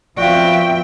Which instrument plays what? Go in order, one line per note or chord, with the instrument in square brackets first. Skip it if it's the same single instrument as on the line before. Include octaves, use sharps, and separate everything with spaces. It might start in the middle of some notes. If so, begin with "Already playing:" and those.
[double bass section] F3 B3 C4 [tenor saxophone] F#4 [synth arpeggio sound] D5 F5 [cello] E5 G5